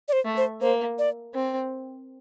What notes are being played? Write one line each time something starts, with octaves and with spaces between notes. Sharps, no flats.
D5
C5
A3
C5
A#3 C5
D5
C4